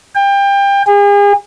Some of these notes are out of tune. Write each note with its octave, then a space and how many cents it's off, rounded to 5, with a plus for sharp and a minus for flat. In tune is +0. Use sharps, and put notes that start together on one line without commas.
G5 +25
G#4 -40